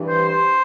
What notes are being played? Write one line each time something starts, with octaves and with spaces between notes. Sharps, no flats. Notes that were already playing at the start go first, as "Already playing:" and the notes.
Already playing: G2 E3
C5
C5